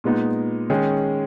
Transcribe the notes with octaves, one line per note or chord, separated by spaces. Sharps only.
A#2 G#3 B3 D#4
D#3 G#3 C#4 G#4